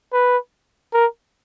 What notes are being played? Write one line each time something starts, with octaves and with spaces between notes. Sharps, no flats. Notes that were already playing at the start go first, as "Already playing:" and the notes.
B4
A#4